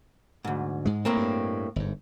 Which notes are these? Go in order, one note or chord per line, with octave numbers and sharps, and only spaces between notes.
D2 G#2
G#2 G#3
A2 A#3 C4
G2
G1 G#2